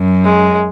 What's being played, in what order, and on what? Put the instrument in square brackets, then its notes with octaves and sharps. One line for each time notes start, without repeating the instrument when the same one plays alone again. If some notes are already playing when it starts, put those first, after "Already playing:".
Already playing: [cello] F#2
[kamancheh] G#3